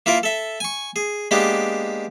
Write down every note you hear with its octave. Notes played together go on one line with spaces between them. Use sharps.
A#3 E4 F4 A#4
A4 E5
G#5 C#6
G#4
G#3 A#3 B3 D4 G4